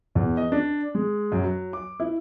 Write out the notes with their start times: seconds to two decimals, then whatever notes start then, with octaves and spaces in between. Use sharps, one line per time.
0.15 E2
0.37 D#5
0.52 D4
0.95 G#3
1.32 F#2
1.44 F#3
1.73 D6
2.00 E4